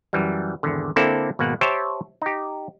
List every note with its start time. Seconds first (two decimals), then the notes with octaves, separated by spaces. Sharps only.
0.13 F#2 E3 G3
0.63 G#1 E2 D3
0.96 D3 A#3 C4 E4 A4 D5
1.39 G#1 B2 A#3 F#5
1.61 G4 C5 C#5 E5 G5 A5
2.22 D#4 G4